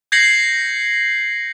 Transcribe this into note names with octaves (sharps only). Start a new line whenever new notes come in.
G6 G#6 A#6 C7 C#7 F#7